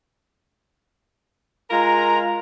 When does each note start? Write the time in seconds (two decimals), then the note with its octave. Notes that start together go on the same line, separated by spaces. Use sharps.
1.70 G#3 F4 A#4 A#5